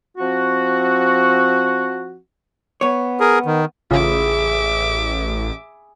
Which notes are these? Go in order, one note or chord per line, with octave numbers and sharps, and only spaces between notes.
F3 C4 F#4
B3 C#5
G#4 A#4
D#3
A1 C#3 F4 G#4 E5 B5 D6